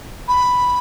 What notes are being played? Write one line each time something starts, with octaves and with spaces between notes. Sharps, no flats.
B5